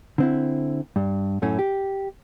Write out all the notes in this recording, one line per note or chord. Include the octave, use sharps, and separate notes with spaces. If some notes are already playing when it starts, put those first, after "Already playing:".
D3 C4 E4
G2
F#2 A2 A3 C#4
G4